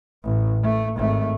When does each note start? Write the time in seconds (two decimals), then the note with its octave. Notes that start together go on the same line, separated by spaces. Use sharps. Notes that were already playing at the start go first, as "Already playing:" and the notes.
0.24 A1
0.63 A3
0.97 G#1 A3